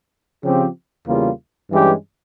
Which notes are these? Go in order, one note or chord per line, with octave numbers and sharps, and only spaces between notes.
C#3 F3 C4 G4
E2 C#3 G3 A#3 F4
G2 E3 G#3 C#4 G4